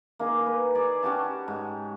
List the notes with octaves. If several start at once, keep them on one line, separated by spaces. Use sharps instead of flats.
A#3 D#4 G#4
B4
G#4 D5
C#4 F#4 G4 A5
G#2